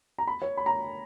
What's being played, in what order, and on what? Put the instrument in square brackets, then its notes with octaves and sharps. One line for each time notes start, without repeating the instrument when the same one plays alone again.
[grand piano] A#5
B5
C#5
B5
A#5